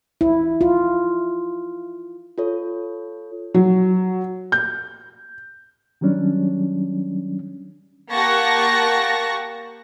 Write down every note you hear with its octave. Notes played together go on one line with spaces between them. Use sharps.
E4
F4
F4 A4 C#5
F#3
G6
D#3 F#3 G3 C#4 D4
A#3 G4 F#5 A5 C#6 A#6